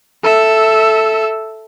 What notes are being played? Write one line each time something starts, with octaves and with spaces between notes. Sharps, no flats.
A4 E5